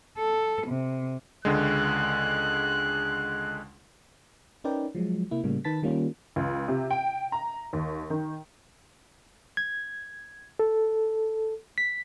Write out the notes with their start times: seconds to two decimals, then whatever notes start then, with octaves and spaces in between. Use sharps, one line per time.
0.18 A4
0.67 C3
1.45 C#2 D3 G#3 F#6
4.64 C#4 D#4 A#4 B4 D5 G5
4.95 F3 F#3 G#3
5.31 C3 A#3 E4
5.44 A2 C#3 G3 A#3
5.64 D#3 B4 A5 A6 B6
5.82 D#3 G3 A#3 C#4 F4
6.36 C#2
6.68 C3
6.90 G5
7.32 A#5
7.73 D#2
8.10 D#3
9.57 G#6
10.59 A4
11.78 B6